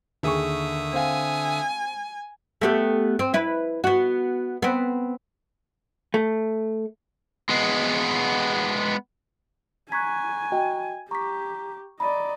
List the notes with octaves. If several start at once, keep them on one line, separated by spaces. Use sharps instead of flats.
D#2 D3 G#4 E5 C#6 D#6
C4 F5 G#5
A3 B3 G4
C4
E4 B4
B3 F#4
B3 C4
A3
G#3 B3
G#5 A#5 C#6 F#6 G#6 B6
F#4 D#5 G5
G4 A#5 C#6 D6 B6
D5 D#5 A#5 B5